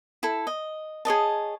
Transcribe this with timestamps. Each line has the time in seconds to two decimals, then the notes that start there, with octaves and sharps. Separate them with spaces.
0.23 E4 A4
0.47 D#5
1.05 G#4 C#5 D#5 A5